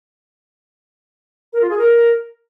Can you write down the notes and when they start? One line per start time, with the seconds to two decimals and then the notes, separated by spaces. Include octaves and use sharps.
1.53 A#4
1.61 F4
1.70 G#4
1.78 A#4